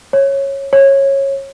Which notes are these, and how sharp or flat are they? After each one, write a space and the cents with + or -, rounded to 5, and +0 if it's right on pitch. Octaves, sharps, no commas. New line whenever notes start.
C#5 -15
C#5 -20